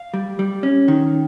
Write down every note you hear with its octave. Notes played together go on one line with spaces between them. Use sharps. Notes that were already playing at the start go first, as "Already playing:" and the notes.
Already playing: F5
G3
G3
C#4
D#3